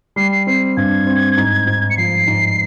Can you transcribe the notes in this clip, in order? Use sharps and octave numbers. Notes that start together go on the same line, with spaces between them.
G3 C7
C7
C4 C7
G2 G#6
C4
G#2
G#2
C#7
F3 C7
G#2